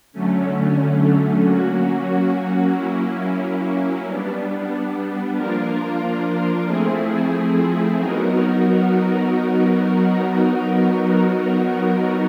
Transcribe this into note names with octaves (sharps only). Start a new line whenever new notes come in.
D3 F#3 A3 C#4
F#3 A#3 C#4 F#4
F#3 A#3 C#4 E4
G3 B3 D4
F3 A#3 D4 F4 A#4
F3 A3 C4 E4 G#4
F#3 B3 D#4 F#4 A#4